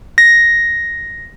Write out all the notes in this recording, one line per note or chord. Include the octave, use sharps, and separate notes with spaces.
A#6